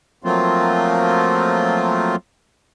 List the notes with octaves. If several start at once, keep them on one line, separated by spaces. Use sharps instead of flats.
F3 F#3 A3 A#3 C4 F4